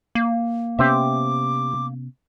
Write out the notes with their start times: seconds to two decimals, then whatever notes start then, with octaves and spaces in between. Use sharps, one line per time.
0.15 A#3
0.79 C3 B3 C#4 G4 C5 E5 D6